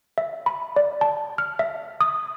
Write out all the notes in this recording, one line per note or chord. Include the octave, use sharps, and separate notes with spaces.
E5
B5
D5
A5
F6
E5
D#6